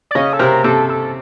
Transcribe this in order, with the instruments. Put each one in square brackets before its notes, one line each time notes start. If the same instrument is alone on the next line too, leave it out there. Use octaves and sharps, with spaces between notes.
[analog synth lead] D5
[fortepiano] C#3 C#4 [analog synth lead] D#5
[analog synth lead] A4
[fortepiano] C3 C4 [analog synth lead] A#4
[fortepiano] C3 C4 [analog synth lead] A4
[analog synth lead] A4